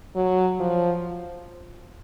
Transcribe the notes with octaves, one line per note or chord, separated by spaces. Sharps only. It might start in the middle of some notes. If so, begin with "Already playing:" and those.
F#3
F3